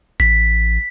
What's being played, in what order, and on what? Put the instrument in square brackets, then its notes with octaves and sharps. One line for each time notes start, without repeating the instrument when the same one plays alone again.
[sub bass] A1 [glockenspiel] B6